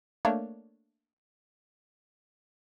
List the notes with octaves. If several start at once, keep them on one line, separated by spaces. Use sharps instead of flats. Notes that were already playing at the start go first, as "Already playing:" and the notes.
A3 A#3 D4 C#5